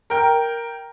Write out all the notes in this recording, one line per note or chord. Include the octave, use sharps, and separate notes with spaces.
A#4 G5